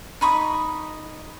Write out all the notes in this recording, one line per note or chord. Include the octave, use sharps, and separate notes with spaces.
D#4 B5 C#6 D#6